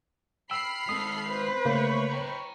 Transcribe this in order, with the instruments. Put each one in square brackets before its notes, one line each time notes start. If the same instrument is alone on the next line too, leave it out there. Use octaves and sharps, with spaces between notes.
[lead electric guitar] G5 [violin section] B5 F6 C7 [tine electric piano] E6
[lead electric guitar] G#3 C4 [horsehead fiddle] A4 [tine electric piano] D#6
[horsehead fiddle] B4 C5
[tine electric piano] C#3 A#3 [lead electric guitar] A3 [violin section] C#5 B5 C#6
[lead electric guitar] G5 A#5